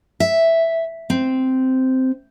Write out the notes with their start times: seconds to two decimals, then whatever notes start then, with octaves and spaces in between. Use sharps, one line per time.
0.20 E5
1.10 C4